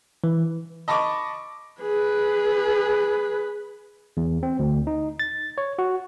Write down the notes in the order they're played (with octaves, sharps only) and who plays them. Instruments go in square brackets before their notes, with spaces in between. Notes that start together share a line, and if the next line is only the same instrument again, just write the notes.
[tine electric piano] E3
[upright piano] D#5 A5 B5 C#6 D6
[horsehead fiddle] G#4 B4
[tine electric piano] E2
C4
D2
D#4
A6
C#5
F#4